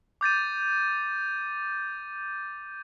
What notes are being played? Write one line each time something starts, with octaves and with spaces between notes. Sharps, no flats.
D6 G6 A6 D#7